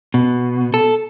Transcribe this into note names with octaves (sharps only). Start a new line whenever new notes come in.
B2
A4